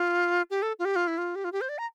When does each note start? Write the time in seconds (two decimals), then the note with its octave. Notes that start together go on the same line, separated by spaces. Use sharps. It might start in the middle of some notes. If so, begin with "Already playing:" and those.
Already playing: F4
0.50 G4
0.62 A4
0.79 F4
0.85 G4
0.96 F4
1.07 E4
1.18 F4
1.35 G4
1.44 F4
1.52 G4
1.61 C5
1.69 D5
1.78 A#5